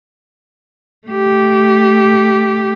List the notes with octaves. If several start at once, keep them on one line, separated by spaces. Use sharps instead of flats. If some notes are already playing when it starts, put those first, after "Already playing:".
A3 G4